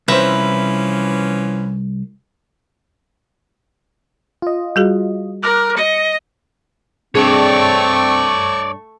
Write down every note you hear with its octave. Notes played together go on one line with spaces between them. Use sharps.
C2 E3 F3 C#4 B4 C5 E5 A#5
F4 D#5
G3 F#4 G#4
A#4 D6 F6 F#6
D#5 C#7
G2 A3 C4 D4 G#4 C#5 D5 C#6